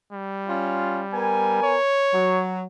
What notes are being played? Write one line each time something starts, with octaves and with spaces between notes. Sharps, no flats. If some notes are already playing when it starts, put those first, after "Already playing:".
G3
C#4 F4
B3 A#4 G#5
C#5
F#3